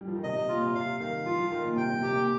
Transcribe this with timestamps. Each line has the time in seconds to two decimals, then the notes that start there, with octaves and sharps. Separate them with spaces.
0.01 G3
0.08 F3
0.16 D#3
0.23 C3 D#5
0.36 C3
0.49 A#2 F4
0.62 C3
0.75 C3 F5
1.00 D#3 F5
1.25 F3 F4
1.38 F3
1.51 D#3 F4
1.64 A#2
1.76 C3 G5
1.90 C3
2.02 C3 G4
2.15 A#2